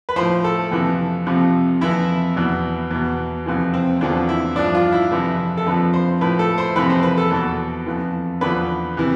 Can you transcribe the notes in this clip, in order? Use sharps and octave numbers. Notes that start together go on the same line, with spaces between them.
B4
A2 F3 C5
A4
F2 C3 E3
F2 C3 F3
F2 E3 E4
E2 B2
E2 B2
F2 C3 E3
C4
E2 D3 F3 C4
E4
G2 F3 D4
F4
E4
F2 C3 E3
A4
F2 D3 F3 B4
C5
A2 F3 B4
A4
C5
F2 C3 E3 B4
C5
B4
A4
E2 B2 A4
F2 E3
E2 D3 F3 B4
C3 E3